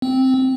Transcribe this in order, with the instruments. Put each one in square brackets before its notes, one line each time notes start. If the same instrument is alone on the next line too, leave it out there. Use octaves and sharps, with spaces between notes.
[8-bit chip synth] C4